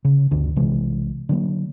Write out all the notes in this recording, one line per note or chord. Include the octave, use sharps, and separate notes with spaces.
C#3
G1 D2 D3 D4
B1 C3 E3 G#3
D3 F#3 A#3